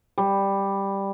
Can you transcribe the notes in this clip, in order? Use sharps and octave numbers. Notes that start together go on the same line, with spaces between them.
G3